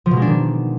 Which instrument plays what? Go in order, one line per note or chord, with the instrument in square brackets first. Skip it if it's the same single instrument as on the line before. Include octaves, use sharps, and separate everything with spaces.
[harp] F3
B2
G#3
D4
D#3